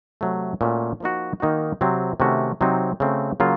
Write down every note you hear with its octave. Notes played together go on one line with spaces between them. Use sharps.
C3 F#3 A3
A#2 A3 C#4 F#4
F3 A#3 D#4 F#4
D#3 A#3 D#4 F#4
C3 F#3 C4
C3 D#3 A3 C#4 F#4
C3 F#3 C4 D#4
C#3 A3 C4 F#4
C#3 F#3 A#3 F4